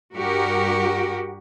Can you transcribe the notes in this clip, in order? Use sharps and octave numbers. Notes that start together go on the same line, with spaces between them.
G2 F#4 G4 A#4